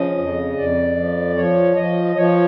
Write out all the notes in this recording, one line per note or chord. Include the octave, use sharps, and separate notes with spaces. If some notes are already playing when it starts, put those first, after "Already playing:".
Already playing: C#3 F3 D#5
F2
F2 D5
F3
F3 C#5
F3 D#5
F3 C#5